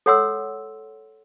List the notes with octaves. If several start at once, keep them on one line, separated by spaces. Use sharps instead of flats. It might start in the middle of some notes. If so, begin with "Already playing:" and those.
A4 C#5 F#5 C6 E6